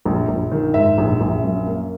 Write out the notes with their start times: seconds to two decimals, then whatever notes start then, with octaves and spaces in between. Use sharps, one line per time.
0.05 A#1
0.28 A#1
0.52 D#3
0.74 G#2 E5
0.98 A#1
1.21 A#1
1.43 F#2
1.66 A#3